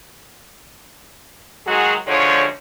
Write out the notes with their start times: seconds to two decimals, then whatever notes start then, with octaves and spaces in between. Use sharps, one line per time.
1.66 D#3 F#3 G#3 F#4 G#4
2.06 F#2 D3 F3 G#3 C#5